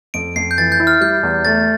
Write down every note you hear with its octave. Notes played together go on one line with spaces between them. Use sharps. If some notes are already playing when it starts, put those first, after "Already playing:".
F2 D7
F2 C7
G6
E3 A6
G6
E4
F6
G3 G6
E2
A3 A6